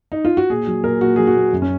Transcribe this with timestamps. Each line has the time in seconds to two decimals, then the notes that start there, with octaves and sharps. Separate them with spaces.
0.12 D#4
0.25 F4
0.37 F#4
0.50 A#2 G#4
0.67 F#3
0.84 A#2 A#4
1.01 A#2 F#4
1.16 F#3 G#4
1.27 F#4
1.35 A#2
1.53 F#2
1.62 C#4